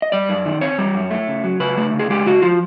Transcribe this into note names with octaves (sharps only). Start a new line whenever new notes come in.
D#5
G3 D5
F#2
D#3
C4 C#5
G3
F#2
A3
C#3
F#3
C#3 B4
A3
C#3
G#4
G#3 G4
C#3 F#4
F3 F4